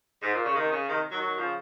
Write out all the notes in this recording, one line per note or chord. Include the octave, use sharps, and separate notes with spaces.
G#2
A#2
C#3
C3 D#3
C#3
C3 D#3
D#3 F#3
D#3 F#3
C#3 F3